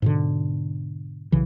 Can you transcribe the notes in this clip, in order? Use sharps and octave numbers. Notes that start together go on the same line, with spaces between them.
G#2 B2 D3
B1 C#3 E3